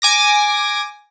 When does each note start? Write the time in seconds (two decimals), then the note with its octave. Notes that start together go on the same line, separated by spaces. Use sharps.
0.02 G#5 D6 A#6